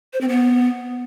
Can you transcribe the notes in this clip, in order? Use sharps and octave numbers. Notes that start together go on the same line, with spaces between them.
C5
C4
B3